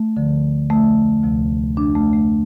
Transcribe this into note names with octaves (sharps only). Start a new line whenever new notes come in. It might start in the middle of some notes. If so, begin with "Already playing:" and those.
Already playing: A3
D2 D3 F3
F2 F3 A3
D2 C3 F3
F2 F3 D4
A3
A3